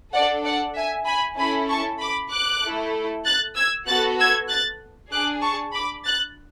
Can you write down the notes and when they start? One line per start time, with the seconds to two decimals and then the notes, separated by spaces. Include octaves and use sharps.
0.13 D4 A4 D5 F#5
0.44 D5 F#5
0.76 E5 G#5
1.07 G#5 B5
1.38 C#4 E4 A4 G#5 B5
1.69 A5 C#6
2.00 B5 D6
2.32 D6 F#6
2.63 A3 E4 A4
3.25 F#6 A6
3.56 E6 G#6
3.87 B3 F#4 A4 F#6 A6
4.19 E6 G#6
4.49 F#6 A6
5.12 D4 G#4 D6 F#6
5.43 A5 C#6
5.74 B5 D6
6.05 F#6 A6